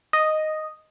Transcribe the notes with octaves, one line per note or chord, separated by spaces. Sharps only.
D#5